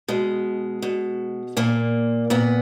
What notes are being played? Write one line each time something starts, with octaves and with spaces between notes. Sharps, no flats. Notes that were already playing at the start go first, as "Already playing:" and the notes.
B2 G#3
B2
A#2 A#3
A#2 B3